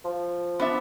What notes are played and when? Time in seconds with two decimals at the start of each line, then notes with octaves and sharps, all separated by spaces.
0.05 F3
0.60 B3 D4 E5